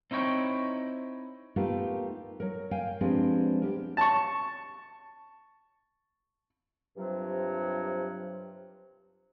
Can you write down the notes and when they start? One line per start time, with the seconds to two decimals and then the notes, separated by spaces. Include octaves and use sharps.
0.11 C4 D#4 E4 C#5 G5
1.56 A3 B3 D#4 F4 G4 A#4
2.40 F#3 A#4
2.71 F5 G5 G#5
3.01 F3 G#3 C4 D4 G4 B4
3.62 B3 G4 A#4
3.97 A5 C#6
6.96 G2 C3 F3 F#3